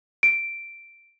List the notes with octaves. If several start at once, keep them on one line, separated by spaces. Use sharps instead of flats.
D7